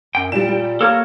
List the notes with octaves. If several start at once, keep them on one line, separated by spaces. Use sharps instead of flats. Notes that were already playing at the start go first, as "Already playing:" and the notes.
F#2 G5
A#2 G3 E7
G3
A#3 A4 A#4 C#5